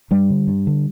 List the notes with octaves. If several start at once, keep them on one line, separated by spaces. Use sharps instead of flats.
G2 G3
D3
G2
D3